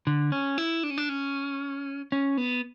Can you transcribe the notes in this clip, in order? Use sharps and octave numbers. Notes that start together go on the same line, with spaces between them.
D3
C#4
E4
D4
C#4
D4
C#4
C#4
B3